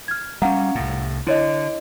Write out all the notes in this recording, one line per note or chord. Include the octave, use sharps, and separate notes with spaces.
F6 G#6
G3 C#4 F5 F#5 A#5
C2 A2
D3 E4 C#5 D#5